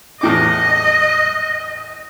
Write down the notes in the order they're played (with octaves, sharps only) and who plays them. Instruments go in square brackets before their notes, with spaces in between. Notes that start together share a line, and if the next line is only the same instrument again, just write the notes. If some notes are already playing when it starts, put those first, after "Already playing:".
[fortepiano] E2 A2 D6 [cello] D#5